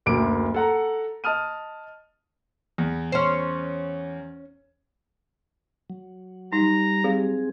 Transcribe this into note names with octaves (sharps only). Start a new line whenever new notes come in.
F#1 D2 D6 D7
A4 F#5 A#5
D#5 A5 D#6 F6 D#7
E2
C#4 C5
F#3
G3 D#4 A#5
F#3 C4 G4 G#4 F5